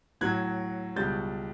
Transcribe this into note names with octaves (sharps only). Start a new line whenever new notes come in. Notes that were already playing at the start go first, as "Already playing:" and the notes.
A2 F#3 F#6 G#6
C#2 B2 G3 G6 A6